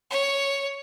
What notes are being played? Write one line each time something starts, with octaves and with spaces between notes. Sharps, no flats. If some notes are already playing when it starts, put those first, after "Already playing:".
C#5